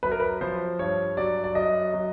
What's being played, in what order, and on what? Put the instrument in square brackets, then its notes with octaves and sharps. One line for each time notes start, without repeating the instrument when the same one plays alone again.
[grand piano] F#2 B4
A#4
B4
F3 C5
G2 C#5
F#3 D5
D5
F#2 D#5
F#3